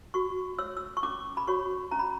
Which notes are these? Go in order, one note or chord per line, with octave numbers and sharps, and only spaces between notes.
F#4 C#6
C#5 E6
E6
C#6
C#4 D6
B5
F#4 C#5 C#6
C#4 A#5
B5